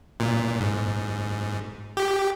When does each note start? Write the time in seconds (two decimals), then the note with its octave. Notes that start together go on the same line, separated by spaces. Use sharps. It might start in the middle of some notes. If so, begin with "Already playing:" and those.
0.20 A#2
0.60 G#2
1.97 G4